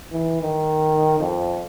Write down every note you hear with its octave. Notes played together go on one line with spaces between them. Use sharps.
E3
D#3
F2